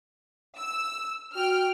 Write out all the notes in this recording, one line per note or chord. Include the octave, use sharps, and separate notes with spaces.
E6
F#4 G5 F6